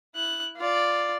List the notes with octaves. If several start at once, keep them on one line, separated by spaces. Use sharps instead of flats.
E4 F#6
F4 D5